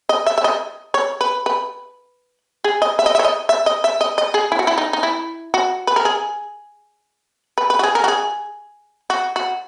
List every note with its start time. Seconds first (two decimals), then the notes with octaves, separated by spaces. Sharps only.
0.09 D#5
0.26 E5
0.38 E5
0.44 D#5
0.94 C#5
1.21 B4
1.46 B4
2.64 G#4
2.82 D#5
2.99 E5
3.06 D#5
3.15 E5
3.19 C#5
3.24 D#5
3.49 E5
3.66 D#5
3.84 E5
4.01 D#5
4.18 D#5
4.34 G#4
4.52 E4
4.59 F#4
4.67 E4
4.78 D#4
4.93 D#4
5.03 E4
5.54 F#4
5.87 B4
5.96 A#4
6.05 G#4
7.58 B4
7.70 B4
7.79 F#4
7.83 G#4
7.95 A#4
8.04 F#4
8.08 G#4
9.10 F#4
9.36 F#4